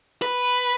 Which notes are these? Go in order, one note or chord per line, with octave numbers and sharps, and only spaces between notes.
B4